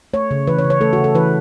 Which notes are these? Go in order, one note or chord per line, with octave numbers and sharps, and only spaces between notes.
A3 C#5
C#3
E3 B4
C#5
C#3
C#5
A3 A4
C#3 F#4
A4
E3 B4